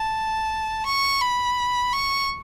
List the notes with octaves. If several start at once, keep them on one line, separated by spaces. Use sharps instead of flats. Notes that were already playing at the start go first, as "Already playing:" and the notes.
Already playing: A5
C#6
B5
C#6